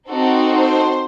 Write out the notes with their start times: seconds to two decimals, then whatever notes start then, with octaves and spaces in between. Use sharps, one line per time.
0.10 C4 D#4 F#4 A4
0.53 C5